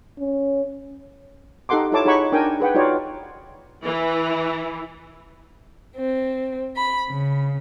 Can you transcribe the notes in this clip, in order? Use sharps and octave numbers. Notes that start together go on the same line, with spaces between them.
C#4
D#4 G4 A4 F#5 C6 D6
E4 F4 A4 C#5 A5 D6
D#4 G#4 C#5 F#5 B5 C#6
D4 D#4 A#4 G5 G#5
G#4 B4 F#5 G5
D#4 F4 F#4 C#5 D5 G5
E3
C4
B5
C#3